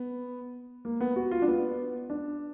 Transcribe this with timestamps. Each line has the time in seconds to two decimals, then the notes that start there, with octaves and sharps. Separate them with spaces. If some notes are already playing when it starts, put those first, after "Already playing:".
Already playing: B3
0.85 A#3
1.01 B3
1.16 F#4
1.31 F4
1.42 D4
1.48 B3
2.10 D4